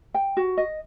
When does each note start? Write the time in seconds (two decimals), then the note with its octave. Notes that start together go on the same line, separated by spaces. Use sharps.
0.14 G5
0.37 F#4
0.57 D#5